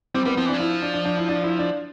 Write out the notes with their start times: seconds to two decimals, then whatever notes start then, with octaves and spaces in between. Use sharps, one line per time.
0.14 G3 C4
0.25 G3 B3
0.37 F3 C4
0.46 E3 D4
0.54 F3
0.60 E4
0.82 D4
0.94 D4
1.05 D4
1.17 E4
1.29 D4
1.44 E4
1.59 D4